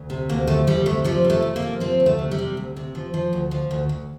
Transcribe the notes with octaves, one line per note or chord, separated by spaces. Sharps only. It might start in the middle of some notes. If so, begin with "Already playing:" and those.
Already playing: D2
C3
D2 A#3
F3 A3
D2 G3
C3 A3
F3 G3
C3
A3
C3
A#3
F3
F3 C4
D2
A3
C3
G3
C3
D2
C3
F3
F3
D2
F3
D2
D2